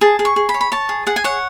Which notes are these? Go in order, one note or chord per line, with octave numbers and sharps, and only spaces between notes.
G#4 A5
G#4
C#6
G#4
B5
C#5
B5
C#5 A5
G#4
G#4 F#5
G#5
C#5 F#5